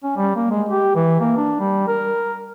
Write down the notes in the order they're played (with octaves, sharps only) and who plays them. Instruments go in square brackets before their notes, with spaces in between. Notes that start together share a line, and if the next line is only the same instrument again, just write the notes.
[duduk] C#4
G3
A#3
G#3
G4
E3
A#3
D4
G3
A#4